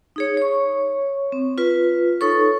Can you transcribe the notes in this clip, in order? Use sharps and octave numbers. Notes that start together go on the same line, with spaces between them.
D#4 G#4 C#5
C#5 C#6
C4
F4 B4
D#4 A4 C#5 C#6